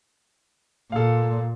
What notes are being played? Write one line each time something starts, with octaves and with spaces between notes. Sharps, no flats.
A#2 A4 F5